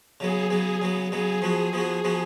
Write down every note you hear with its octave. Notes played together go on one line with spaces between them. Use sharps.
C#3 F#3 B3 G#4
C#3 F#3 B3 G#4
C#3 F#3 B3
C#3 F#3 B3 G#4
F3 B3 F#4
F3 B3 F#4 G#4
F3 B3 F#4